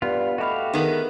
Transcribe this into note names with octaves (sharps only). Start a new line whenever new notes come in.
G2 B3 F4
A3 F#4 G4 D#5 F5 B5
D#3 B3 G#4 A#4 B4